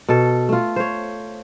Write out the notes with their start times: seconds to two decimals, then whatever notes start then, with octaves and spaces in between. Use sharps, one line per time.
0.09 B2 A4
0.49 A3 F4
0.76 C5 C#5